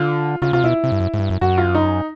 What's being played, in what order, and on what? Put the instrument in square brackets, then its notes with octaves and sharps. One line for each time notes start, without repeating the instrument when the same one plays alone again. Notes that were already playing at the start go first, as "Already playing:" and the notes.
Already playing: [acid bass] D3 [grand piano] F4
[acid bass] C#3 [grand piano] F4
[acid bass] C3 [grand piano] F4
[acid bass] B2 [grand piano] E4
[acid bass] C3
G2
F#2
G#2
G2
F#2
[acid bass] F#2 [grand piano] F#4
[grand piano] F4
D#4